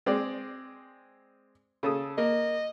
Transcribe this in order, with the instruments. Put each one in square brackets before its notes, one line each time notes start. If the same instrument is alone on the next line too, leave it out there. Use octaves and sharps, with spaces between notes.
[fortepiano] G#3 C4 D5
C#3 A4 D#6
[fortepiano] A#3 [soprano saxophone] D#5